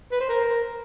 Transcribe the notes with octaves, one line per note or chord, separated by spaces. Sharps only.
B4
C5
A#4